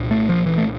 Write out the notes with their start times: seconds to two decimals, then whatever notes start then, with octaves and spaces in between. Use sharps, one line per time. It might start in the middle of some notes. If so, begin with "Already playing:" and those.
Already playing: C2 A#2
0.11 A3
0.29 F3
0.46 E3
0.58 A3